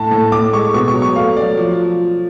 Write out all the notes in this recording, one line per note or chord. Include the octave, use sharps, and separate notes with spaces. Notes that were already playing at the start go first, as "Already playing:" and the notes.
Already playing: A2 A3 A5
A2
A2 D6
G#3 C#6
B2 C#6
C#6
F#3
C#6
A3 F5
F#3 D5
F3